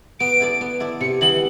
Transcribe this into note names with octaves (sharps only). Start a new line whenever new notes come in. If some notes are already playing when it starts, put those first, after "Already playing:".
B3 D7
E4 A4 D5
B3
E4 A4 D5
C3 C#7
E3 G3 B3 E4 F#7